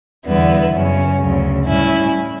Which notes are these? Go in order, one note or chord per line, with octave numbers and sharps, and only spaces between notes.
E2 D3 G3 B3 E4
F#2 C#3 F#3 C#4
D2 C#3 F#3
A2 G3 C#4 E4